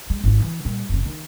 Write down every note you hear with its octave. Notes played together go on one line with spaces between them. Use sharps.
G#3
G#1 F4
E3 E4
A#2 G3
F#1 C#3
D#3 D#4